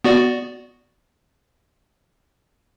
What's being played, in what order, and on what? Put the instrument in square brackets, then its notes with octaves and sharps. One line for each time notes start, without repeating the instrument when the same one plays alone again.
[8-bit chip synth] B3 F#4 D5